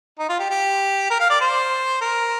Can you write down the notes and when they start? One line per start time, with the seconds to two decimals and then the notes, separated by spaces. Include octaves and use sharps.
0.19 D#4
0.29 F4
0.39 G4
0.50 G4
1.10 A#4
1.20 F5
1.30 D5
1.41 C5
2.01 A#4